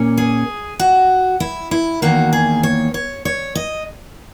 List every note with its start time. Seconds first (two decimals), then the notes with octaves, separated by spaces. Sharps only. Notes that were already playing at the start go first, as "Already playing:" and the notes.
Already playing: A#2 A#3 C#4
0.17 G#4
0.79 F#4
1.40 E4
1.71 E4
2.02 E2 D#3 A#3 F#4
2.33 G#4
2.63 C#5
2.94 C#5
3.25 C#5
3.55 D#5